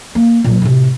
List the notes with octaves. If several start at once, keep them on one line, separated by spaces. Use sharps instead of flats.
A#3
A#2 F#3
A2 C3